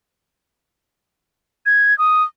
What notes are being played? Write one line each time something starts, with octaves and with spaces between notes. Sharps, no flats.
G#6
D#6